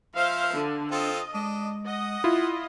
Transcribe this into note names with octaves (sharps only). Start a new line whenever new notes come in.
F3 C5 E5 F5
D3 D4
C4 F4 A4 D#5
G#3 D4
D#5 F#5
E4 F4